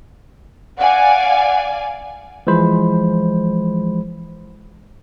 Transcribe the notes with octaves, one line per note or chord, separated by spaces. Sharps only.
D5 F5 F#5 G#5
E3 F3 G#3 C5 B5